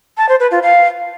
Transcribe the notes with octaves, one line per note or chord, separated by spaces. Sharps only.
A5
C5
B4
F4
F5